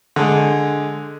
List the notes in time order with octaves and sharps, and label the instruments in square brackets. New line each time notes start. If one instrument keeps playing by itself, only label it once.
[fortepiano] D3 G#3